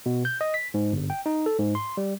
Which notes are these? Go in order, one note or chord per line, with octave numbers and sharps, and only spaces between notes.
B2
G6
D#5
B6
G#2
G1
G5
D#4
A4
G#2
C6
G3